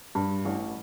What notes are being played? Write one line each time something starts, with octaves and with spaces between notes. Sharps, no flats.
G2
A1